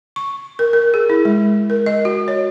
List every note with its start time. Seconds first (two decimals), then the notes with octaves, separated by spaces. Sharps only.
0.16 C#6
0.59 A#4
0.73 A#4
0.94 G#4
1.10 E4
1.25 G#3
1.70 A#4
1.86 D#5
2.05 F#4
2.28 C#5